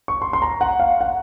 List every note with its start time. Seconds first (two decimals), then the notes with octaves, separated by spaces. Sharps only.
0.08 C#6
0.22 C6
0.33 C6
0.42 A#5
0.61 F#5
0.80 F5
1.01 F#5